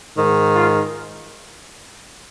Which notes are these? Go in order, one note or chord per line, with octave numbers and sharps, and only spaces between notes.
G#2 D#3
F4